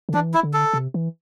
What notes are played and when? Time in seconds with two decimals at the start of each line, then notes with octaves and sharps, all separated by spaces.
0.09 D3
0.14 E3 D4
0.34 E4
0.43 D3
0.53 A4
0.73 C3
0.94 E3